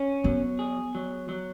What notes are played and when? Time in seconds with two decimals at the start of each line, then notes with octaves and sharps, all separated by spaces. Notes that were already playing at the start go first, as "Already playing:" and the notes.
Already playing: C#4
0.24 F#3 B3
0.59 G#4
0.95 F#3
1.29 F#3